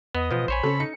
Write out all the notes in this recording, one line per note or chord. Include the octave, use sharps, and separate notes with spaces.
E2 B3 D#5
A1 B2 F3 B3
A#1 C5 C#5 G#5 B5
C#3 C#4 A4
D#4 C#7